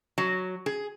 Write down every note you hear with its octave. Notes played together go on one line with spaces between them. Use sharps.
F#3
G#4